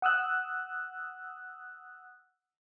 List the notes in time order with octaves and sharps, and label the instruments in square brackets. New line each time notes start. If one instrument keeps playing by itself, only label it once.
[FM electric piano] F#5 D#6 E6 F#6